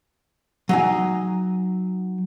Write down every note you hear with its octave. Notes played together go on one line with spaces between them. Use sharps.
F#3 D#4 G#5